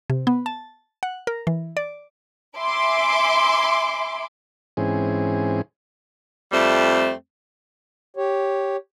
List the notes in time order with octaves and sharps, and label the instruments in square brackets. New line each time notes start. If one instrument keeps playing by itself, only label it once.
[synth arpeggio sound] C3
B3
A5
F#5
A#4
E3
D5
[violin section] E5 G#5 B5 C6 D6
[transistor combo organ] G#2 E3 C4 C#4 G#4
[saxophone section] F2 G3 A3 C4
[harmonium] G4 C#5